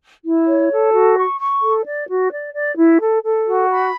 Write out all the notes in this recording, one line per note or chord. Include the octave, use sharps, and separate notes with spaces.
E4
C#5
A4
F#4
C#6
C#6
A4
D5
F#4
D5
D5
E4
A4
A4
F#4
B5